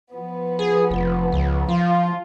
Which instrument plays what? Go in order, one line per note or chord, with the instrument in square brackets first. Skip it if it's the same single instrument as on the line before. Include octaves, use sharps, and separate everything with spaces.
[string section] F3 B3
[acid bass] G#4
F1
C#2
[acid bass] F3 [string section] F4